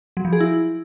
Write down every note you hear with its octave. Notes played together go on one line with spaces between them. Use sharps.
F#3
F3
G#4
E4